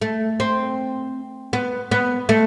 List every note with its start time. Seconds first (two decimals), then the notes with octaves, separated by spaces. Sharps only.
0.01 A3
0.40 C4
1.53 B3
1.91 B3
2.29 A3